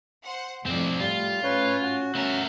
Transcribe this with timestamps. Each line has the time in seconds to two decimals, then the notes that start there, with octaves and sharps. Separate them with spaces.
0.25 C5 F#5
0.66 F2 A2 C4 D5
1.00 A2 G3 F4
1.44 C#4 B4 C#5
1.81 F#4
2.15 A3 C#4 A#4